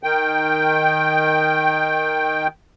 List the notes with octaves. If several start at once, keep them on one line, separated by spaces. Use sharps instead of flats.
D#3 G5